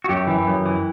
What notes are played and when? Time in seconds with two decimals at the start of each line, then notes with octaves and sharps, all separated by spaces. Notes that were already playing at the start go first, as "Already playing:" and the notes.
0.04 F#4
0.09 F#2 G4
0.27 E3
0.47 F#2
0.66 E3